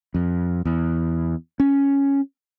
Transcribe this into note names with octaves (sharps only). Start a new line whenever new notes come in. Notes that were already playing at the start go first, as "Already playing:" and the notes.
F2
E2
C#4